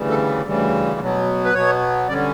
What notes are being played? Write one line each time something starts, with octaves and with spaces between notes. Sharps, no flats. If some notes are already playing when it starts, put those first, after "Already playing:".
Already playing: D2 C#3 E3 G3
A4
D2 C#3 E3 G3
B2 F#3 B3
B4
B2 F#3 B3 C#5
D3 G3 C#4 D5